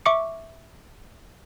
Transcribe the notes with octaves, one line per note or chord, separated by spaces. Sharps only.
E5 C#6 D6 C#7